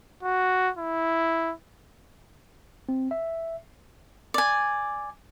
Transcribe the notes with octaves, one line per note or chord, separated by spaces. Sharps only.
F#4
E4
C4
E5
D5 G#5